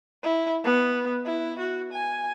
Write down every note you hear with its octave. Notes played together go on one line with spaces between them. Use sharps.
E4
B3
E4
F#4
G#5